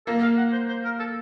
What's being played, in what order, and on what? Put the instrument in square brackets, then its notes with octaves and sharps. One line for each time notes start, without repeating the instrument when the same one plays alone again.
[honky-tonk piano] A#3 [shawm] A4
[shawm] F5
F#5
C5
C5
A#4
A4